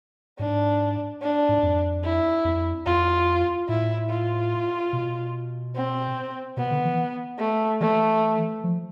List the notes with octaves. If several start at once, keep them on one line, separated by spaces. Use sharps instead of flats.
G#2 D4
D4
G#2
F2
E4
F2
F2 F4
A2 E4
F4
B2
C4
B2 B3
D3
E3
A3
E3 A3
F3